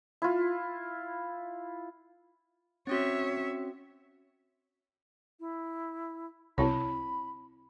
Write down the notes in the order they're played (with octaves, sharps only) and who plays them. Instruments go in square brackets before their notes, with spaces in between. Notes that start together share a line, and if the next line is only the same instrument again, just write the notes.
[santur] E4 F4
[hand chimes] C4 C#4 F#4 [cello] C#5 E5
[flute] E4
[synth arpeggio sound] C2 [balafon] C4 E4 C#5 [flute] B5